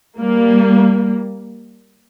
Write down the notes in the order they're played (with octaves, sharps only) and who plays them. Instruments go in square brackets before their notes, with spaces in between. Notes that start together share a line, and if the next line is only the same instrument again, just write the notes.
[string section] G3 A#3